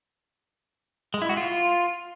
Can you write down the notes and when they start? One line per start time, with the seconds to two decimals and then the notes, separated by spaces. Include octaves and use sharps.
1.14 G#3
1.22 E4
1.29 F#4
1.37 F4